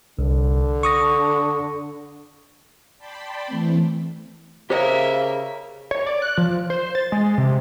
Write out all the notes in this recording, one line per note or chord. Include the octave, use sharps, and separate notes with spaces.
C2 D3
C#6 D#6 A#6
D5 G5 A5 B5 C6
E3 A3 C4
C#3 A#3 G4 C5 C#5 D#5 E5
C#5
D5
F#6
F3
C5
A6
G#3
C3